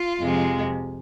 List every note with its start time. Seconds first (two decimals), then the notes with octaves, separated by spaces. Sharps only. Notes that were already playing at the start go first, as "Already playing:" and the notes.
Already playing: F4
0.18 F2 C3 F3 G#3